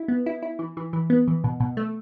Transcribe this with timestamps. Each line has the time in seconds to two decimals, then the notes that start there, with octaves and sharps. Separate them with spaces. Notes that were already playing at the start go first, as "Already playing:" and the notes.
Already playing: E4
0.08 B3
0.26 E4
0.42 E4
0.59 E3
0.77 E3
0.93 E3
1.10 B3
1.28 E3
1.44 B2
1.60 B2
1.77 A3